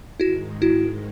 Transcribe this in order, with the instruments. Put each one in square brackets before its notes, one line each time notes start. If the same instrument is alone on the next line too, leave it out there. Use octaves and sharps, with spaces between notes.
[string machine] G#2 D#3 G#3 [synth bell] E4 F#4
[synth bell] E4 F#4